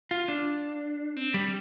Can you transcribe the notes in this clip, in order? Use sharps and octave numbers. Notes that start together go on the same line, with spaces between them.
F4
D4
C4
G3